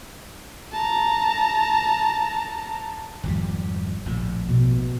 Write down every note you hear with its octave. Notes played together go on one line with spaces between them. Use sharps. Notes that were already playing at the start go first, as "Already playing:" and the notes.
A5 A#5
G#1 F2 G3
A#1 A2
B2